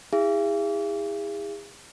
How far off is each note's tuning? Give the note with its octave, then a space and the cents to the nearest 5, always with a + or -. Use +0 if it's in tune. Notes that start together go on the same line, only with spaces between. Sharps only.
E4 -30 G#4 -40 F5 -45